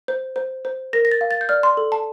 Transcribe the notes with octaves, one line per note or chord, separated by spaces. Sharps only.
C5
C5
C5
A#4 A#6
A#6
A6
F5
A6
G6
D5 F6
C6
A4
A5